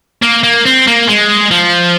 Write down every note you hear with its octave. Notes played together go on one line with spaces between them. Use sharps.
A#3
A#3
C4
A#3
G#3
F3